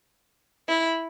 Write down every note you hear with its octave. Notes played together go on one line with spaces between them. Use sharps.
E4